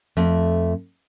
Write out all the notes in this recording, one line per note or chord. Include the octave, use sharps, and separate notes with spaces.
F2 A3